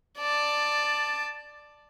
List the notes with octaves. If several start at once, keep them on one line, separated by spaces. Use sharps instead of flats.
D5 A5